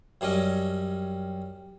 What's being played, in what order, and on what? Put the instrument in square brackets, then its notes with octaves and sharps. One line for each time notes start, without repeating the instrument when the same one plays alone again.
[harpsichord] F#2 G3 C#4 D#5 G5